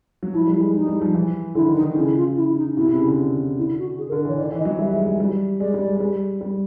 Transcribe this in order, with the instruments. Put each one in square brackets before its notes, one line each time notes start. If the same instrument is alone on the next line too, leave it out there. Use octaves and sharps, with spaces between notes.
[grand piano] F#3
[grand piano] F3 [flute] E4
[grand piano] G3
[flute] E4
[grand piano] G#3
[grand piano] G3 [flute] D#4
[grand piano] G3
F3
E3
[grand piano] D3 [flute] E4
[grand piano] D#3
[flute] D#4
[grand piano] D#3
[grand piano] C#3 [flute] E4
[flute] F4
E4
D#4
[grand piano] C3 [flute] E4
[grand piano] C3
C#3
D3
[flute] E4
F#4
G#4
A#4
[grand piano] D3
[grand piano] E3 [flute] C#5
[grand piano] D#3 [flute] D5
[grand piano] E3
[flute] D#5
[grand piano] F#3
[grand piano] G3 [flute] E5
[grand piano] G#3
G#3
G3
[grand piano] G#3 [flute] D5
[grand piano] G3
G#3
G3
G3